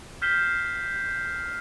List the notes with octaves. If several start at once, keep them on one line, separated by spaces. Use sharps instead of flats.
F6 G6 B6 C7 E7 G7